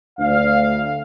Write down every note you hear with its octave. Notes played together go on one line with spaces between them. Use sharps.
D2 F5